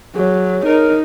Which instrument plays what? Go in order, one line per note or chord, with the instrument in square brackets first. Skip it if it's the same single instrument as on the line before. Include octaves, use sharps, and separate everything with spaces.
[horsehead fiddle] F#3 [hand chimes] G#4 C#5
[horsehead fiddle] D#4 [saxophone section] A#4